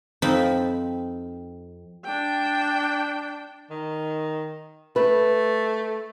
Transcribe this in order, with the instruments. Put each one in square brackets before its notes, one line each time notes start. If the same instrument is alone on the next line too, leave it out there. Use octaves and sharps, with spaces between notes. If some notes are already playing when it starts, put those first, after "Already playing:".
[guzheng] F2 C4 D#4 B5
[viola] D4 G5
[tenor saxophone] D#3
[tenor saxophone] A3 [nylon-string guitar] B4